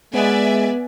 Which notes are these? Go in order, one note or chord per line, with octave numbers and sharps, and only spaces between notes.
G#3 B3 B4 D5 E5 G#5